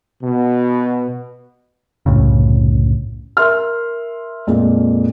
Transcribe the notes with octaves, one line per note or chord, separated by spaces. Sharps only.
B2
C2 F#2 A2 C#3
A#4 E5 C6 F6
F2 A#2 G#3